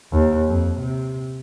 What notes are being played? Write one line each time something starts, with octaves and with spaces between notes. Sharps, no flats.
D#2
F2
C3